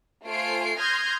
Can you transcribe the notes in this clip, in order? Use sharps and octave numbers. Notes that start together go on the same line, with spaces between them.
A3 F4 C5 G#5 C7 D7
C6 D#6 F6 G6 G#6 A#6